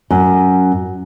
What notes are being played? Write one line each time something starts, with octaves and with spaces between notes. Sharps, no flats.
F#2